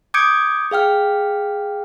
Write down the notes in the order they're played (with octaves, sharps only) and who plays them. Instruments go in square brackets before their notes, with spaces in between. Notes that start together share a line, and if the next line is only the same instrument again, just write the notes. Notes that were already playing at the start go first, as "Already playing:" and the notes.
[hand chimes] D6 D#6 G6 G#6 C#7 D7
G#4 F5 G5 F6